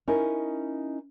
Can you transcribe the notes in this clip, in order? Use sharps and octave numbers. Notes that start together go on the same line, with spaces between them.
C#4 D#4 E4 A#4 D#5